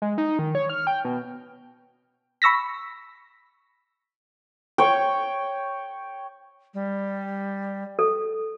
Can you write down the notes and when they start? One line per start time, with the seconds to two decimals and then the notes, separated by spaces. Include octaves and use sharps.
0.02 G#3
0.18 D#4
0.39 D#3
0.55 C#5
0.69 F6
0.87 G5
1.05 B2
2.42 B5 C#6 E6 A#6 B6
4.78 C#5 G5
6.74 G3
7.99 A4